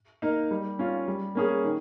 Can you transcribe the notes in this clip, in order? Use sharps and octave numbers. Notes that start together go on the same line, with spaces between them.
A#3 D#4 A#4
G3
C#4 F4
G3
A#3 C#4 G#4
D#3